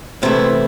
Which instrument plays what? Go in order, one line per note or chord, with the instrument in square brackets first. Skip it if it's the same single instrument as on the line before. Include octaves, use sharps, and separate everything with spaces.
[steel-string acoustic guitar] E2 C3 E3 A3 E4